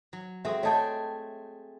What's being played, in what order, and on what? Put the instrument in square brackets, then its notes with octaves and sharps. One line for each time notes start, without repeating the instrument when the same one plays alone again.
[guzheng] F#3
[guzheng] G#3 C4 F#4 [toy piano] A4 E5
[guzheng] A3 G#4 G5 [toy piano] C#5 D#5 A5